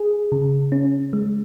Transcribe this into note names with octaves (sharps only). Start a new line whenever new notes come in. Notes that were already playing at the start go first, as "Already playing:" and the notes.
Already playing: G#4
C#3
C#4
G#3